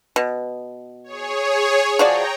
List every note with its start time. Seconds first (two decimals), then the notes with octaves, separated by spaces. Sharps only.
0.16 B2
1.04 G#4 C#5
1.99 F3 F#4 D5 G5 A#5